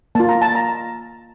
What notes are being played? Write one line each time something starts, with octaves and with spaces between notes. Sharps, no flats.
A#3 F4 A5
A#5
A5
A#5